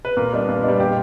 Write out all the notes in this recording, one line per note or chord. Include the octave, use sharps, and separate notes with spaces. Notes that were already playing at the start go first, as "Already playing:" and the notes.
B4
A#2 A#4
G3 B3 D4
A#2
G3 B3 D4
A#2 G4